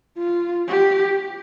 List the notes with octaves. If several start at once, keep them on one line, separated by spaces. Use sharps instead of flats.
F4
G4